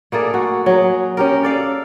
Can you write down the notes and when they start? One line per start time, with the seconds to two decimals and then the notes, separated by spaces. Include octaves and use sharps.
0.12 A3 A#3 G#4 D5
0.34 F#4
0.66 F#3 G#4
1.17 C#4 G4 A#4
1.43 A4 D5 F5